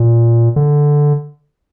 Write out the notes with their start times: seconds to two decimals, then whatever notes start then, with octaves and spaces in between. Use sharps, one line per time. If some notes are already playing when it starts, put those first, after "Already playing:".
Already playing: A#2
0.56 D3